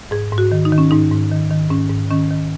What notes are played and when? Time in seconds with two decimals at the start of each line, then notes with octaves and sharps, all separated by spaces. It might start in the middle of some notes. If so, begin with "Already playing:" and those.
0.11 G#2 G#4
0.32 G#2
0.38 F#4
0.52 D#3
0.65 D#4
0.72 D#3
0.78 C#4
0.91 G#2 D#4
1.11 G#2
1.31 D#3
1.51 D#3
1.70 G#2 C#4
1.90 G#2
2.11 D#3 C#4
2.31 D#3